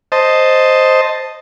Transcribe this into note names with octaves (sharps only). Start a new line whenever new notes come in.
C5 D#5 A5